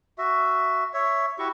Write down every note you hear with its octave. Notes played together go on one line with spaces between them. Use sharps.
F#4 E5
C#5 E5
E4 F#4 G4 C#6